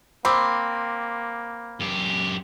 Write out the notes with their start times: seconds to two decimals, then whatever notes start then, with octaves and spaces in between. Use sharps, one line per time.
0.25 A#3 C4 B5 C6 D6
1.80 F#2 G4